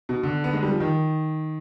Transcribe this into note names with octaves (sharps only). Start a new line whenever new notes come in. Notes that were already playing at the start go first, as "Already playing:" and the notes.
B2
D3
B3
G#3
G3
F3
D#3